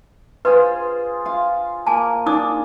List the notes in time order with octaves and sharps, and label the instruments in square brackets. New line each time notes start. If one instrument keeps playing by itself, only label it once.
[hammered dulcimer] F4 G#4 C5 [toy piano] B4
[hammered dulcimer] F4 F5
[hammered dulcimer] A#3 [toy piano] G#5 A5
[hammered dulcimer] D4 G#4 [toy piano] D#4 D6 D#6